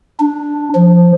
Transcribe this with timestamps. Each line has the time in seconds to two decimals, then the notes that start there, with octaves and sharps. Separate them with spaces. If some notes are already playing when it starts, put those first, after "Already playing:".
0.20 D4
0.75 F3